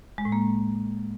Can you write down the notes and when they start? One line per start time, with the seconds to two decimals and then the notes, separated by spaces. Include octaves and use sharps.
0.18 G#3
0.25 A2
0.32 A#3